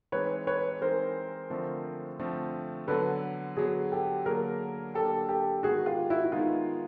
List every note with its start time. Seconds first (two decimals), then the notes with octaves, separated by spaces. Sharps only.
0.12 E3 G#3 C4 D#4 B4 C#5
0.47 B4 C#5
0.81 E3 G#3 C4 D#4 A#4 C5
1.50 D3 F3 A3 C4
2.19 D3 F3 A3 C4
2.88 D3 F#3 B3 A4 B4
3.56 D3 F#3 B3 F#4 G#4
3.92 G4 A4
4.26 D3 F#3 A#3 D4 G#4 A#4
4.94 D3 F#3 A#3 D4 G4 A4
5.29 G4 A4
5.63 D#3 G#3 B3 F#4 G#4
5.86 F4 G4
6.10 E4 F#4
6.25 E4
6.32 D#3 G#3 B3 D#4 F4